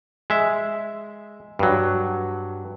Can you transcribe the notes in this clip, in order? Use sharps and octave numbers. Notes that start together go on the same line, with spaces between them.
G#3 E5
G2 F#3